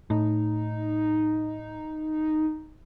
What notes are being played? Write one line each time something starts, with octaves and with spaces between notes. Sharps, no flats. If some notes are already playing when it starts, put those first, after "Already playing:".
A2 D#4